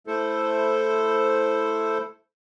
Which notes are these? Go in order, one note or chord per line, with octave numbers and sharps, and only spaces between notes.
A3 E4 A4 C5